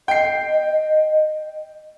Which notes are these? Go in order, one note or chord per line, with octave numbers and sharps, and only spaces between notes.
D#5 G5 C7